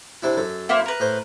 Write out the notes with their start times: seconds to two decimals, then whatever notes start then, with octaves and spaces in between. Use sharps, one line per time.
0.22 C3 D4 E4
0.37 F#2 A4
0.69 A#3 E4 C5
0.86 A#4 B4
1.00 A2 C5